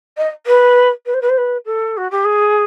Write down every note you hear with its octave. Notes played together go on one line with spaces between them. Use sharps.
D#5
B4
B4
C5
B4
C5
B4
A4
F#4
G4
G#4